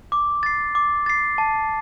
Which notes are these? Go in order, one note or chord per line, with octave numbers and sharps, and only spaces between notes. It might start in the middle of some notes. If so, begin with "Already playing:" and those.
D6
A6 C7
D6
A6 C7
A5